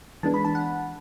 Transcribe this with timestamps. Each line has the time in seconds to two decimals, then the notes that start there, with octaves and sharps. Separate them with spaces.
0.23 E3 G#3 B3 D4 A5
0.34 B5
0.45 A5
0.55 F#5